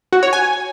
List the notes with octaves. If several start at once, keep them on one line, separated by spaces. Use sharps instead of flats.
F#4
C#5
G#5